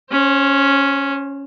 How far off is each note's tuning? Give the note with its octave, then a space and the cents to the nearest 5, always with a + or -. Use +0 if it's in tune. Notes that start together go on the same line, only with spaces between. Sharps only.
C#4 +0 C5 +35